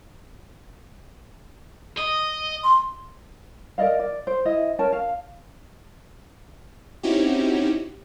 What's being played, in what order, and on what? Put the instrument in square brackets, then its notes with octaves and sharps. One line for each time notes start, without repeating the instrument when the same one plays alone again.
[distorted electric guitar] D#5
[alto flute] C6
[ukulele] A#4 D5 D#5 F5
D5
C5
E4 D#5 E5
C#4 A#4 G5 A5
F5
[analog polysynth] C4 C#4 D#4 E4 F#4 G4